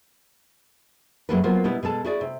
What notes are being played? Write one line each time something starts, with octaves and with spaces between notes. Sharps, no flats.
F#2 F#3 G#3 A#3 A4 B4
F#3 A#3 B3 F4 A#4 C5
B2 G3 B3 E4
B2 G#3 A4 A5
E4 F#4 G#4 D5
C3